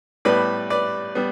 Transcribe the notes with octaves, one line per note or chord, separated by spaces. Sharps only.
A2 G3 B3 B4 D5
B4 D5
G3 B3